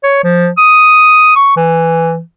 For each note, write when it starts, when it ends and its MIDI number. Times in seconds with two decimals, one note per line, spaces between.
0.03 0.23 73
0.24 0.49 53
0.58 1.35 87
1.36 1.53 85
1.57 2.20 52